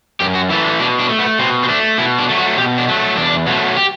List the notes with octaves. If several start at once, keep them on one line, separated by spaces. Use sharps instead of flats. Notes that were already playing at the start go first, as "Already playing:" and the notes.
F#2 G4
F#4
E3 A3 E4
D4
B2 D4
D4
A3
B3
B2 C4
C4
A3 D4
B2 E4
D4
F#3 A3
F#4
B2 G4
D4
F#3 A3
E2 D4
B2 F#3 A3
G4